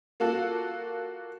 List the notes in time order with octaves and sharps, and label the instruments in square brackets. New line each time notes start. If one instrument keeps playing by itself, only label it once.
[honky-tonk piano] A#3 F4 F#4 A4